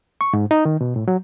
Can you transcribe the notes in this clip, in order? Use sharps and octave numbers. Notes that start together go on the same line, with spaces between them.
C#6
G#2
D#4
D#3
B2
A2
F#3